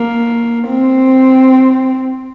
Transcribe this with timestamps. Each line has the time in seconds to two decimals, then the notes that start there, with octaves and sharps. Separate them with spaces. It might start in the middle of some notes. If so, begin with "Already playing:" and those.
Already playing: A#3
0.69 C4